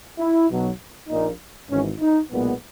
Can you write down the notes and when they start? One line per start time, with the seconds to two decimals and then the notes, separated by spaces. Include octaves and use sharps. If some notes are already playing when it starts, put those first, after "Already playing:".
0.18 E4
0.48 B1 B2 F#3 B3
1.08 A#1 A#2 A#3 D#4
1.69 G#1 G#2 E3 C#4
2.00 D#4
2.31 B1 A#2 G#3 B3